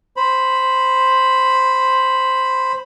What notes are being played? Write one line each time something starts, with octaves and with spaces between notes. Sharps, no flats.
C5 B5